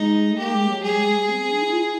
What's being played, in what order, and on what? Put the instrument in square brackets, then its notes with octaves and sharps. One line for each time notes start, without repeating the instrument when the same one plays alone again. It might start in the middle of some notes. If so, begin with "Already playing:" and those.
Already playing: [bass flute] G#3 [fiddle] D#4
[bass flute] A3
[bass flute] A#3 [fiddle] G4
[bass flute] G#3
F#3
[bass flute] G3 [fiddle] G#4
[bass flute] G#3
G#3
G3
C4
C4
D4
E4
F4
E4